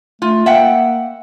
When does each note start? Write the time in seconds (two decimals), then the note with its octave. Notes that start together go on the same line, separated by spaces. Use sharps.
0.22 A3 F4
0.46 A#3 E5 F#5 G5